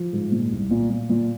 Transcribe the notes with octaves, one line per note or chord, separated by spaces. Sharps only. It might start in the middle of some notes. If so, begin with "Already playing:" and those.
Already playing: F3
G#2
A#2
C2
A#2
A#2
A#2